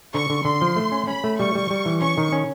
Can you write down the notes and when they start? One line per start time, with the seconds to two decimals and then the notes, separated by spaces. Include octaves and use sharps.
0.14 D3 C#6
0.30 D3
0.45 D3 C6
0.61 F3
0.76 A3
0.92 C#4
1.07 C#4 B5
1.24 A3
1.39 G3 C#6
1.55 G3
1.70 G3
1.86 E3
2.01 C#4 C#6
2.18 D#3
2.32 C#4